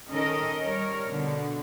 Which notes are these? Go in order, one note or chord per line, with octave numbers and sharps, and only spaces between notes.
D#3 C#4 A4 A#4 D#5
G3 A#4 C#5
B2 D3